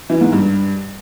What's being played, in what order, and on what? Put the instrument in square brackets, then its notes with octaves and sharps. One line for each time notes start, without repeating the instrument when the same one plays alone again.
[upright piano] E3
G#2
G2